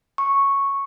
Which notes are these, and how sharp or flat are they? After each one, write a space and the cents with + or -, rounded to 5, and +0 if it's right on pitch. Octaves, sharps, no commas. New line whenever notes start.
C#6 -5